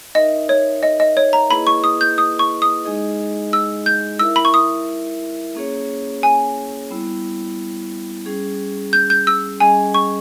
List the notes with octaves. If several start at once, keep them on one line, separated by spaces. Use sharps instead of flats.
D#4 A#4 D#5 E5
C#5
D#5
D#5
C#5
A#5
A#3 E4 G#4 B4 D#5 B5
C#6
D#6
G6
D#6
C#6
D#6
G#3 D#4 G#4 D#5
E6
G6
E4 A#4 E5 E6
B5
C#6
D#6
A#3 C#4 G#4 C#5
G#5
G3 B3 E4
G3 C#4 G#4
G6
G6
E6
G3 C#4 G#4 D#5 G#5
C#6